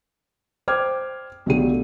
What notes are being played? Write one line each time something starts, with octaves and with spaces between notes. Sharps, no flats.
C5 G5 D6 F6 G#6
B1 D3 A3 G4 D#7